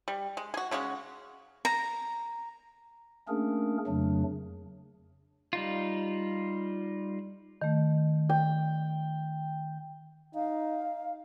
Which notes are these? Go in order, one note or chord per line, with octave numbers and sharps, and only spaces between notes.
G3
G#3
F#4 G#4
C#3 G#3 C#4 F#4
A#5
A3 A#3 C#4 D4 G#4 A#4
F2 C#3 F#3 A3 D4
G3 D#4 F4
D#3 A3
G5
D#4 F5